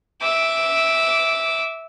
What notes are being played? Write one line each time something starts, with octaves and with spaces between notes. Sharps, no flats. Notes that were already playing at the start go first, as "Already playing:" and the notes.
E5 D6